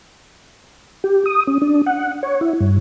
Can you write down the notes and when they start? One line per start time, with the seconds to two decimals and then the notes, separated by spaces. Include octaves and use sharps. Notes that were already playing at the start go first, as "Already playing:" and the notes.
1.04 G4
1.26 D#6
1.47 C#4
1.62 D4
1.86 F#5
2.23 C#5
2.41 E4
2.60 G2